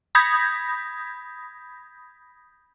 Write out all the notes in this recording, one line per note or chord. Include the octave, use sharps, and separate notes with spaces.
B5 D#6 G6 G#6 A#6 B6